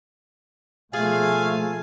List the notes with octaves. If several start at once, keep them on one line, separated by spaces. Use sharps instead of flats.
B2 F3 A3 A#3 F4 G#4 F5 G#5